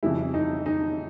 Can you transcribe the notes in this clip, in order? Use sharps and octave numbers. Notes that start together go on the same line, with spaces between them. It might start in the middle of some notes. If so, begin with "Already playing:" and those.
F2 C#3 E3 G3 E4
D#4
D#4